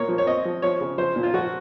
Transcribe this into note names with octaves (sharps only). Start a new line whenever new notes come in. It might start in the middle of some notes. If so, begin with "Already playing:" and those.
Already playing: A#2 A#3 C#5
F3
C#5
C4 D#5
F3
F3 C#5
C#3
F3 C5
A#2
F4
F3 F#4